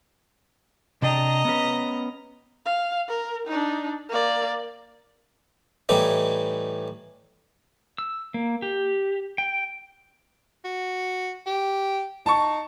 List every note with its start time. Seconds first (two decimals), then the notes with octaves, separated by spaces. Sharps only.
1.02 C3 D4 D#5 G5 A#5
1.45 B3 C#4 B4
2.66 F5
3.08 A#4
3.47 D4 D#4
4.09 A#3 D5
5.89 A2 E3 G3 D#4
7.98 E6
8.34 A#3
8.62 G4
9.38 G5
10.64 F#4
11.46 G4
12.26 D#4 A5 C#6